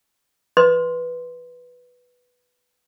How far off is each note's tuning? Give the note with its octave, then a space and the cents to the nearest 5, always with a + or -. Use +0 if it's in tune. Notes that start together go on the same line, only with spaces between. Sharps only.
B4 +0 D#5 +5 C6 +0